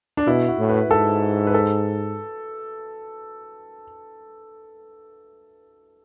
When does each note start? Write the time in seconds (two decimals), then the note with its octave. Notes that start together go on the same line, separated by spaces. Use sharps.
0.17 D4
0.27 B2 E4
0.48 F#4
0.59 A2
0.69 B4
0.90 G#2 A4
1.47 B4
1.54 A4